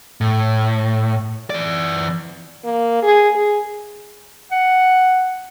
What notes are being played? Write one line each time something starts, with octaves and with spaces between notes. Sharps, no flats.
A2
E3 D5
A#3
G#4
G#4
F#5